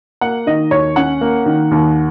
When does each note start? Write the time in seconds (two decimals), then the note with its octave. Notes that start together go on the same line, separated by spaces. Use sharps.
0.21 A#3 F#5
0.47 D#3 D#5
0.71 D#2 C#5
0.96 C#4 F#5
1.21 A#3
1.46 D#3
1.71 D#2